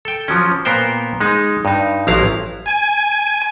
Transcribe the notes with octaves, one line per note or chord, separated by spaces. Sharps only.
A4 G5
F3 F#3 C#4
A#2 B3 A#4 C5 G5
G#3 D#4
G2 D#4
A1 F3 F#3 E4 F5 A#5
G#5